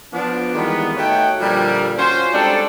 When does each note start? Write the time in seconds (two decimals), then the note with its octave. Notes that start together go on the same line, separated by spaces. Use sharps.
0.13 F3 B3 D4
0.54 D#3 E3 G3 G#3 A#3 B3
0.97 A3 D#4 F#4 C#5 F#5 G5
1.40 A#2 D3 F3 G3
1.97 C#4 F4 F#4 C5
2.33 G3 G#3 C4 D4 D#4 A4